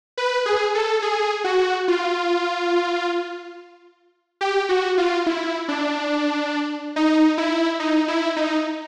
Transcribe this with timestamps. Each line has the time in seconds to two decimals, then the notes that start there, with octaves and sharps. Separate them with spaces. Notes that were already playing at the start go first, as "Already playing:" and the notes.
0.17 B4
0.46 G#4
0.75 A4
1.02 G#4
1.44 F#4
1.88 F4
4.41 G4
4.69 F#4
4.98 F4
5.26 E4
5.68 D4
6.96 D#4
7.38 E4
7.80 D#4
8.08 E4
8.36 D#4